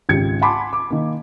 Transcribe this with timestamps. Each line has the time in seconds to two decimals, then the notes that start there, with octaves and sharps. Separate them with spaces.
0.09 G#1 C#2 D#4 G4 G#6 C#7
0.41 F#5 G#5 A5 B5 C6 D6
0.73 D6
0.90 D#3 A#3